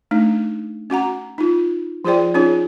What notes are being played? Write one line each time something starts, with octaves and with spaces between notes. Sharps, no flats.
A3 D4 D#4
C#4 F#4 F#5 A#5
D#4 F4
F3 F4 G#4 C5 D5 G5
C#4 D#4 F4 G#4 C#5